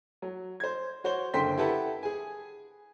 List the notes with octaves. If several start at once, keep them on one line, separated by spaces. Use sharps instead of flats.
F#3
C5 G#6
F#4 C5 C#5 G7
F#1 D3 C5 G5 C6 B6
E4 G4 A4 B4 F#5 A5
G#4 G#5